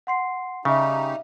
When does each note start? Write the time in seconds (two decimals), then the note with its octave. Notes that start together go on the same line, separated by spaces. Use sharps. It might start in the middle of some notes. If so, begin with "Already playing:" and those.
0.07 F#5 C6 C7
0.65 C#3 G3 D#4 G4 E5 F5